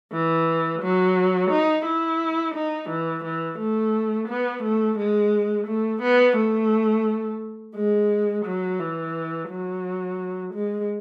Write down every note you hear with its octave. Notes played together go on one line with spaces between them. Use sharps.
E3
F#3
D#4
E4
D#4
E3
E3
A3
B3
A3
G#3
A3
B3
A3
G#3
F#3
E3
F#3
G#3